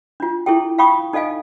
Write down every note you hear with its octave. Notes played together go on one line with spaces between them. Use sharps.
D4 F4
E4 G#4 A4 G5
F5 G5 B5 C#6 D#6
D#4 A4 D#5 F5 G#5